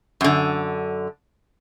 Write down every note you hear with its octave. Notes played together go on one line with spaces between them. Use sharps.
F#2 D3